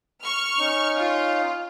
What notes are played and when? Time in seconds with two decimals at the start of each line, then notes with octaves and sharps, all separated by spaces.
0.23 C#6 F6
0.59 C#4 D#4
0.97 F4 F5